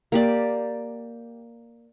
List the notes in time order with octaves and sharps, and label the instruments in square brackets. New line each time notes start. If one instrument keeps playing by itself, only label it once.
[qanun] A#3 G4 D5